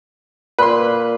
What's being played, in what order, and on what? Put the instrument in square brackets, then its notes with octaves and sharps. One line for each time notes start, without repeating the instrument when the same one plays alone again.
[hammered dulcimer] A#2 [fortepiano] B4 C6